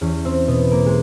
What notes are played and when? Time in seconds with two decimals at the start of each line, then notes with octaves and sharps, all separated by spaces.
0.01 E2 C#4
0.25 C4
0.48 B2 B3
0.71 A#3
0.86 G#3